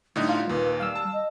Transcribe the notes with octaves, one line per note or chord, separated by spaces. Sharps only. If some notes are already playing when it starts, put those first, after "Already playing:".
A2 D3 G3 D#4
F4
D#2 A#2 B4
G3 F5 E6
A5
D#5